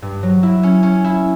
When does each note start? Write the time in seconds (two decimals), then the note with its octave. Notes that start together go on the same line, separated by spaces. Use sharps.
0.02 G2
0.23 F#3
0.43 E4
0.63 C#4
0.83 C#4
1.04 E4